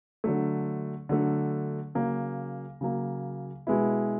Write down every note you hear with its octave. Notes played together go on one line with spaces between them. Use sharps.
D3 F#3 A3
D3 F#3 A3
C#3 F#3 A#3
C#3 F#3 A#3
B2 G#3 B3 E4